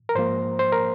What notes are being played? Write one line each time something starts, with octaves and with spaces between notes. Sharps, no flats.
A#4
G#2 F3 A#3 C5
C5
A#4